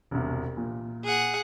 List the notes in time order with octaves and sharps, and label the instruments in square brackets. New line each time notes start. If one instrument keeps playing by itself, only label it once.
[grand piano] E1 C2
A#2
[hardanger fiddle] G#4 F#5